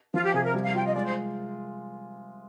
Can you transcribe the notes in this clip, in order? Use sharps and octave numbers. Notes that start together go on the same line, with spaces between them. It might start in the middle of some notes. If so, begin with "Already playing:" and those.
F3 F4
G4
C3 G#4
A#4
G3
F5
F4 G5
D#5
G#3 D5
C5